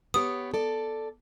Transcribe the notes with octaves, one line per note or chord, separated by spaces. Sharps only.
B3 G4 C#5 D#6
A4 D5